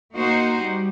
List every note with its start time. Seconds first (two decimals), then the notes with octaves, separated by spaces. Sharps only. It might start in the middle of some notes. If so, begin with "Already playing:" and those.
0.14 A#3 D#4 F#4 C5
0.60 G3